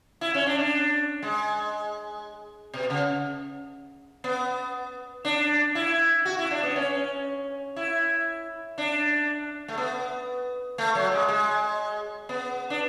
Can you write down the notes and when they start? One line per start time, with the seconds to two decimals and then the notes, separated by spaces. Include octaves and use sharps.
0.21 E4
0.34 C#4
0.47 D4
0.59 D4
1.22 G#3
2.74 B2
2.90 C#3
4.24 B3
5.25 D4
5.75 E4
6.25 F#4
6.38 E4
6.51 D4
6.63 B3
6.76 C#4
7.76 E4
8.78 D4
9.68 A3
9.78 B3
10.78 A3
10.95 F#3
11.11 G#3
11.28 G#3
12.29 B3
12.70 D4